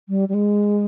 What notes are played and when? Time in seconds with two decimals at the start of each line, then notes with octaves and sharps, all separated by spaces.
0.09 G3
0.29 G3
0.34 G#3